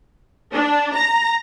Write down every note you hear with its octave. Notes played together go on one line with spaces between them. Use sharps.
D4
A#5